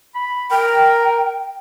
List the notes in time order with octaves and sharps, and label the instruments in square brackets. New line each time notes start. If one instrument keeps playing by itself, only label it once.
[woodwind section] B5
[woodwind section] A#4 [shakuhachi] G5